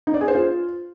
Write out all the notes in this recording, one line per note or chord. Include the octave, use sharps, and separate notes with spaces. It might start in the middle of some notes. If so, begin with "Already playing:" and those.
D#4
D5
G#4
C5
F4